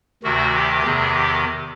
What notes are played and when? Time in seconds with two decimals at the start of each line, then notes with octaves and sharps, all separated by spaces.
0.23 D2 C3 D#3 F#4
0.55 G4
0.84 E2 C3 D#3 G#4
1.14 G4